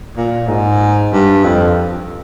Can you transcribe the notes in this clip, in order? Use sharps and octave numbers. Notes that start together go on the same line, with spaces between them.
A#2
G#2
G2
F2